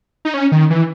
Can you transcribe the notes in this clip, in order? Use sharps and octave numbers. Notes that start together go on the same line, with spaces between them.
D#4
C#4
D#3
E3